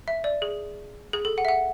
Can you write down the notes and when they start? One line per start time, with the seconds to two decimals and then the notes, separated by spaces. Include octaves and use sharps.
0.08 E5
0.24 D5
0.42 G#4
1.13 G#4
1.25 A4
1.38 F#5
1.45 E5
1.48 F#5